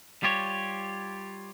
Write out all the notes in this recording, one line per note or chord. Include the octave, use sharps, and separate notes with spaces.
G3 F4 G4 C#5